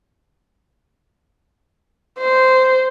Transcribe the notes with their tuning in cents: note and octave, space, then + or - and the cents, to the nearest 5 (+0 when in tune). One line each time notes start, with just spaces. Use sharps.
C5 -10